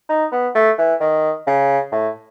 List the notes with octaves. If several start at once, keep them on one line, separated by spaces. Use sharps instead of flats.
D#4
B3
A3
E3
D#3
C#3
A2